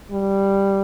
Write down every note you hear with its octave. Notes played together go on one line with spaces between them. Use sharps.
G3